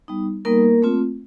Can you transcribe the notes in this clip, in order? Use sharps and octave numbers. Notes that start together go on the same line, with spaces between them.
G3 B3 D#4
G3 A#3 B3 D#4 A#4
A3 C4 F4